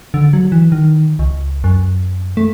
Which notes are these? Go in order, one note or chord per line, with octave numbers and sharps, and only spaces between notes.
D3
F#3
E3
D#3
C#2
F#2
A3